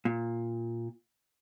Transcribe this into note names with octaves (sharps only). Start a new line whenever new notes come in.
A#2